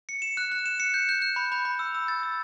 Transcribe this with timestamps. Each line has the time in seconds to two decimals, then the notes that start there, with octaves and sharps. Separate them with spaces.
0.09 C#7
0.22 E7
0.37 F#6
0.52 F#6
0.66 E7
0.80 C#7
0.94 G6
1.09 G6
1.22 G6
1.36 B5
1.52 B5
1.65 B5
1.79 E6
1.95 E6
2.08 A6
2.23 E6